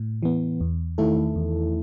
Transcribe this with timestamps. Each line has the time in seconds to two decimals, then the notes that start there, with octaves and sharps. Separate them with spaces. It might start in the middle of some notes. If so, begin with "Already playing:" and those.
Already playing: A2
0.23 E3 B3
0.61 E2
0.98 D#3 A3 E4 A4
1.36 E2